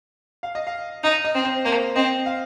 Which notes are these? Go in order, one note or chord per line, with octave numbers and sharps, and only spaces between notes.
F5
D#5
F5
D#4 D#5
D#5
C4
C5
A#3 C5
C4 D#5
F5